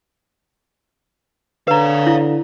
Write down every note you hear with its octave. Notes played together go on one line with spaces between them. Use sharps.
D3 B4 C#5 F5 A#5
E4